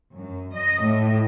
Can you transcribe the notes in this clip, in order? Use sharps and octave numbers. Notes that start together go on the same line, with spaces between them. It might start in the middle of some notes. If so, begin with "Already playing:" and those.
F#2
D#5
A2